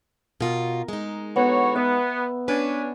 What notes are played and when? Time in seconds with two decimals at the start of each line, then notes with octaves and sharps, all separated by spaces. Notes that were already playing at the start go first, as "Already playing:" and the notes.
0.40 B2 F4 A#4
0.88 G#3 D#4
1.36 D3 B3 F#4 C#5
1.76 B3 E5
2.48 C#4 D4 B4